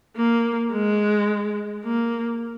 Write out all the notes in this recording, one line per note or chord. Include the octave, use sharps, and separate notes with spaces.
A#3
G#3
A#3